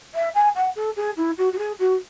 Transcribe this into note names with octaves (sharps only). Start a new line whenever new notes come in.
E5
G#5
F#5
A4
G#4
E4
F#4
F#4
G#4
F#4